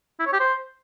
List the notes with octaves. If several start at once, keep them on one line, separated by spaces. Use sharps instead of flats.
E4
C#5
G4
C5